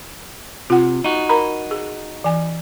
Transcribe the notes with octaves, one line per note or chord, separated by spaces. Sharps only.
C3 F4 F#5
D#4 F#4
A#4 A#5 B5
G#4
E3 G#5